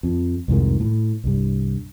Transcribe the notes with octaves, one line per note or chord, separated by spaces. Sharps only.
F2
C2 F2 G#2 D#3
A2
C2 G2